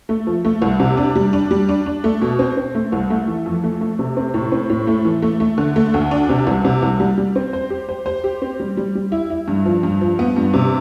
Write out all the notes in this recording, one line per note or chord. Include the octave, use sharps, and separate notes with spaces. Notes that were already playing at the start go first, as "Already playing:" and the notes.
A3
F3
A3
C2
C3
D4
G3
D4
G3
D4
D4
A3
B2
C4
C4
A3
C2
A3
E3
F2
A3
A3
C3
C4
A2
C4
A2
A3
E3
A3
A3
D3
A3
D2
D4
C3
C2
C3
C2
G3
G3
C4
C5
G4
C5
C5
G4
C4
G3
G3
G3
E4
E4
G2
F3
G2
F3
B3
G2
C3